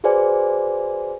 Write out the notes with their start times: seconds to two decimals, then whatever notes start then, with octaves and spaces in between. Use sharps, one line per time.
0.04 F#4 G#4 B4 C5 D5 G#5